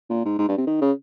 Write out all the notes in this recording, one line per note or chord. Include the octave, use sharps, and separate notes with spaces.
A#2
G#2
G#2
G2
C3
D#3
C#3